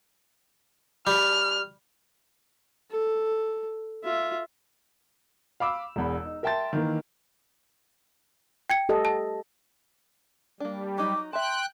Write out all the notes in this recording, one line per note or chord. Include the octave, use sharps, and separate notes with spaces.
G3 F6
A4
F4 E5
F5 B5 D6 E6
E1 E2 B5
D#4
A#4 E5 G5 A5 C6 A6
D#3 E3 A#3
G5 G#6 C#7
G4 A4 D#5
A5
G3 A#3 D4
F#3 D#4 D6
E5 G5 A5 C6 F#6